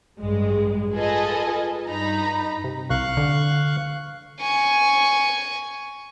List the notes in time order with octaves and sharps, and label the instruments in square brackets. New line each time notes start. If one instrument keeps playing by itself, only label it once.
[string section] A1 G2 G#3
F4 G#4 A4 B4 D#5
G2 D#4 A#5 B5
[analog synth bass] C3
[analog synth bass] C2 [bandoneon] F5 C#6 F#6
[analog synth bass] D3
[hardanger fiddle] G#5 C#6